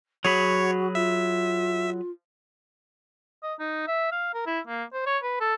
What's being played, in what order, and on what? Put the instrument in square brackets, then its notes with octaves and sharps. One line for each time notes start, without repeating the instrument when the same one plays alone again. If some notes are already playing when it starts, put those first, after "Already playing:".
[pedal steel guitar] F#3 G#4 B5 [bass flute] F#4 [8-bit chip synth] C#5
[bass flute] F4 [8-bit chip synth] E5
[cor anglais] D#5
D#4
E5
F5
A#4
E4
A#3
C5
C#5
B4
A4